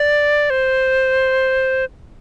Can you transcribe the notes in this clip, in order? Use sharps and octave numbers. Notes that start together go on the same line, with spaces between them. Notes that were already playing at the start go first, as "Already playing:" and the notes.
Already playing: D5
C5